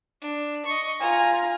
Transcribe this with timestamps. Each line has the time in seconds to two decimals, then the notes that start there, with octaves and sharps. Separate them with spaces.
0.21 D4
0.65 D#5 C#6
1.01 F4 G#5 A#5